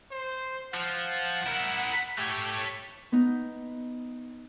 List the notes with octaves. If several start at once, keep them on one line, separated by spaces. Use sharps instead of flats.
C5
F3 F#5
E4 A#4
A3 G4 C#5
B3 D#4